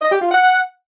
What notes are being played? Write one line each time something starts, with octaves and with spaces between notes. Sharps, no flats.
D#5
G4
F4
F#5